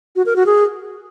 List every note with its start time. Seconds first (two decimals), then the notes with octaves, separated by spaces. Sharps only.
0.16 F#4
0.26 A#4
0.36 F#4
0.46 G#4